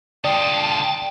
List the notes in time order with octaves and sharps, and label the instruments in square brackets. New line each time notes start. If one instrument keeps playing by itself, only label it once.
[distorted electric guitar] D3 F4 [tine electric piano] D5 D#6 [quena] G5 [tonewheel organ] A5